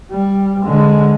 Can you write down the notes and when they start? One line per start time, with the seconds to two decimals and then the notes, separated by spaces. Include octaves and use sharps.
0.12 G3
0.65 D3 G#3